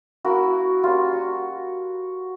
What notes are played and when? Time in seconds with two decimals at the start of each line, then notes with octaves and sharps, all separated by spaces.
0.24 A#3 C#4 E4 F#4
0.83 G3 A#3 C#4 F4
1.13 F#4